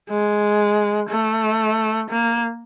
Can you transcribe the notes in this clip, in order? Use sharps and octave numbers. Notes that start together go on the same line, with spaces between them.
G#3
A3
A#3